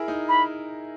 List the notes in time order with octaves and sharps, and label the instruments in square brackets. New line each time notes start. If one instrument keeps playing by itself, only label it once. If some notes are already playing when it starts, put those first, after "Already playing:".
Already playing: [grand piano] E4 G#4 A#4
D#4
[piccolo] B5